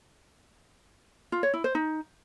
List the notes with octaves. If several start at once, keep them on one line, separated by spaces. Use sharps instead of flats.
F4
C#5
E4
C5
D#4